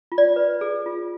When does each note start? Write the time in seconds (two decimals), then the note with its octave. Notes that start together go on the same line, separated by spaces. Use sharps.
0.12 F4
0.18 D5
0.36 B4
0.61 G#4
0.86 F4